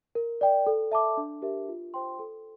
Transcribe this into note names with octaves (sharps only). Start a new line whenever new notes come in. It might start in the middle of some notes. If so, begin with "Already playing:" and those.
A#4
D5 G5
A4
E5 A5 D6
D4
G4 A#4 E5
F4
C5 G5 C6
A4